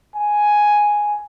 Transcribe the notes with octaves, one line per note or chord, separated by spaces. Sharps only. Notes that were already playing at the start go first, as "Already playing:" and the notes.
G#5